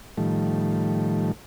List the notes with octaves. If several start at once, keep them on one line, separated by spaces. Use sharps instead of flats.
A2 D#3 F3 G3 A3